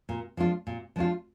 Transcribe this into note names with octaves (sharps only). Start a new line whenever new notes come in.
A#2
F3 G#3 D4 F4
A#2
F3 G#3 D4 F4